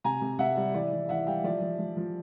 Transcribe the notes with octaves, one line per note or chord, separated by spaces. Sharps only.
C3 G#5 A#5
C3
C3 E5 F#5
G3
E3 D5 E5
E3
E3 E5 F#5
G3 F5 G5
F3 D5 E5
F3
F3
F3